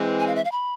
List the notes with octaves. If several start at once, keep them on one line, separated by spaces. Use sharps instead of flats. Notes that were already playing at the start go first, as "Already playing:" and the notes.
Already playing: E3 G#3 C4
G#5
F5
E5
F5
B5